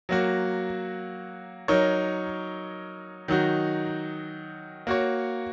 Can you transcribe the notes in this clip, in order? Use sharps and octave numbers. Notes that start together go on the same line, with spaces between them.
F#3 A#3 F#4
F#3 D#4 A#4 C#5
D#3 F#3 D#4 F#4
A#3 F#4 C#5